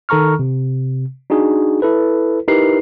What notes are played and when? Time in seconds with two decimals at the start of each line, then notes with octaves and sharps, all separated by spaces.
0.09 D#3 A4 A#5 C#6 F6
0.39 C3
1.30 D4 D#4 F#4 G#4
1.82 E4 A4 B4
2.48 D#4 E4 G4 A#4 B4 C7